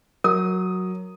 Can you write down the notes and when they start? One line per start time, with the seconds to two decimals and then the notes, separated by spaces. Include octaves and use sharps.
0.24 F#3 A#4 D#6